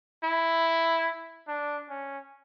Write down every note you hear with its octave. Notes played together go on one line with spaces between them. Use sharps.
E4
D4
C#4